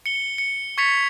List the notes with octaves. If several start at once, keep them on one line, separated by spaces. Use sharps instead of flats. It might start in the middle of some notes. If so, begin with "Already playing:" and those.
C#7 G7
C#7
C#6 G#6 A6 B6 C#7 F7